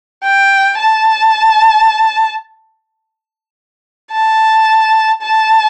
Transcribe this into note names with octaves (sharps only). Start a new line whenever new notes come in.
G5
A5
A5
A5